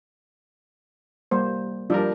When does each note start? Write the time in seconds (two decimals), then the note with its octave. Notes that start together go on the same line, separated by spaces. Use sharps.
1.31 G3 A#3 C5
1.90 F3 G3 D4 A#4